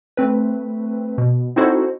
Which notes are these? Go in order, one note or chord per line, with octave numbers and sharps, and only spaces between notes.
A3 C4 B4
B2
C4 D#4 E4 F#4 A4 C5